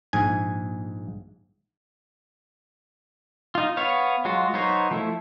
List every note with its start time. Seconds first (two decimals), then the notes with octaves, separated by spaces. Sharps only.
0.13 A#1 G#2 G#5
3.55 D#4 F4
3.77 B3 C#5 F5
4.25 F#3 G#3 F4 F#4
4.53 F#3 B3 D#4 C5 C#5
4.91 F3 A3 E4